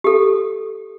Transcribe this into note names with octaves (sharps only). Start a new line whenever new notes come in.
G4 A4